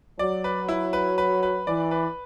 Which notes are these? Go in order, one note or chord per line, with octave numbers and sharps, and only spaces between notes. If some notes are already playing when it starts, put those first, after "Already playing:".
F#3 D5
B4
E4
B4
B4
B4
E3 D5
B4